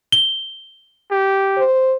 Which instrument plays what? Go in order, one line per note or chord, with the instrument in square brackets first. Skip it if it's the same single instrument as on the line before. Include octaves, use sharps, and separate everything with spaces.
[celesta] G7
[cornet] G4
[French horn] C5